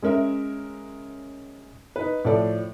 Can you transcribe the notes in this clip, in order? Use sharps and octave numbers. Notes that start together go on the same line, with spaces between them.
G#3 C#4 A#4 E5
D#4 B4
A2 F3 A4 D5